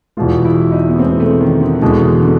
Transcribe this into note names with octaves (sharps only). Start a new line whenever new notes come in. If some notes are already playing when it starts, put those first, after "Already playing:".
E2 B2 G#3 F4
E4
D#4
B3
E2 B2 G#3 C4
A3
D#3
D3
E2 B2 D3 G#3
D3